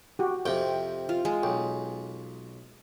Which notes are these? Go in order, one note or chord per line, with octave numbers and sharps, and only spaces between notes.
F#4 G4
F2 C3 G5
F4
G#3
B1 G5